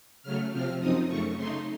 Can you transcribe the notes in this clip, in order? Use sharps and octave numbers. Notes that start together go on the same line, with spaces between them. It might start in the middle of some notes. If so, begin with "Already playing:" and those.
C#3 F#3 A3 F6
C3 F3 C4 F6
F#2 F3 C4 D#4 D#6
F#2 C#3 A3 C#6
C#3 A3 D#4 C6